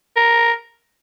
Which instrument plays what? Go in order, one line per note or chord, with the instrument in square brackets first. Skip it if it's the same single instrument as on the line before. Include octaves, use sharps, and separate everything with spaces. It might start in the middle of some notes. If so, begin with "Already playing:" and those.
[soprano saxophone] A#4